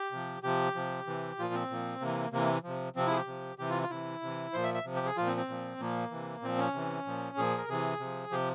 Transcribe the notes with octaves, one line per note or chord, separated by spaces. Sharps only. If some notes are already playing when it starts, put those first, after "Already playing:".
Already playing: G4
C3 F3
C3 F3 G4
C3 F3
C3 E3
A#2 F3 F4
C4
A#2 F3
C3 E3 A#3
C3 E3 A#3
C3 F3
C3 F3 C4
E4 G#4
G4
C3 F3
C3 E3 G4
F4
F4
C3 E3 E4
C3 E3
A#2 F3 C5
E5
E5
C3 F3
G4
G#4
A#2 F3 F4
C4
C4
A#2 F3
A#2 F3 A#3
C3 E3
A#2 F3 C4
C#4
C3 E3
A#2 F3
A#2 F3 G#4
A#4
C3 E3 G#4
C3 F3
C3 F3 G4